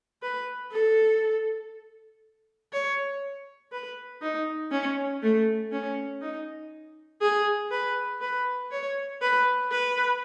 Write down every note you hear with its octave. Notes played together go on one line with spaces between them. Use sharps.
B4
A4
C#5
B4
D#4
C#4
A3
C#4
D#4
G#4
B4
B4
C#5
B4
B4